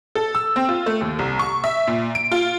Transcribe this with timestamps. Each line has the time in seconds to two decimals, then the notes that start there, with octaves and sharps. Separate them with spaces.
0.15 A4
0.35 E6
0.56 C4
0.69 F4
0.86 A3
1.01 D#2
1.19 C2
1.39 C#6
1.64 E5
1.87 A#2
2.15 D7
2.32 F4